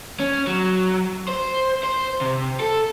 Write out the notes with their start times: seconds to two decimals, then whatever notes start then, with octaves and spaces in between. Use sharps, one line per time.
0.20 C#4
0.47 F#3
1.28 C5
1.84 C5
2.21 C3
2.60 A4